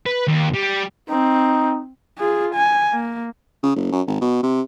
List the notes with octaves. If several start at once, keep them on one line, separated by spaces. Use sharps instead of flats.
B4
D#2
G3
C4 D#4
F4 G#4
G#5
A#3
C#3
F#1
F#2
G#1
B2
C3